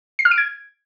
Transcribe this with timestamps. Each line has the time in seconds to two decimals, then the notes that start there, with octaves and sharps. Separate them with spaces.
0.19 C7
0.25 F6
0.31 D7
0.38 G#6